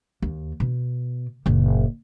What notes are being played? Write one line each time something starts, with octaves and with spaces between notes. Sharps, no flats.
D#2
B2
F#1 A#2